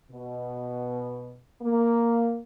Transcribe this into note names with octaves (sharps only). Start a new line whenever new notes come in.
B2
A#3